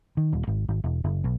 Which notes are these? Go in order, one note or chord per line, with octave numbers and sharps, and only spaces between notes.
D#3
D#1
G#1
G#1
E1
F#1
B1